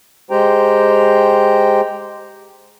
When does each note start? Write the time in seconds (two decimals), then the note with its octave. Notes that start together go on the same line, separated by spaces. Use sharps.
0.31 G#3 G4 C5 G5 A#5